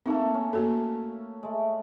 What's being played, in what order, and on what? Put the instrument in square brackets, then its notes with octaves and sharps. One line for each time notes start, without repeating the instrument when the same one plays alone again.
[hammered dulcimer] A3 A#3 A4 [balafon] C4 D#4
[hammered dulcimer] C#4
[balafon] A#3 F#4 A4
[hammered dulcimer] G#3 A3